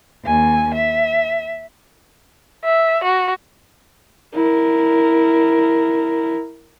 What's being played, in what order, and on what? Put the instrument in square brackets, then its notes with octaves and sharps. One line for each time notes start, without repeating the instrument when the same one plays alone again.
[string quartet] D#2 G#5
E5
[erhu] E5
F#4
[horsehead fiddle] E4 A#4